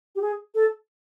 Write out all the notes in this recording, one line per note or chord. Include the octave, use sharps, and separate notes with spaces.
G4
G#4
A4